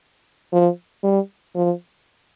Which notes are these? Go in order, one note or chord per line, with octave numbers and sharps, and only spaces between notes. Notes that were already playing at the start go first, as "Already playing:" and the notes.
F3
G3
F3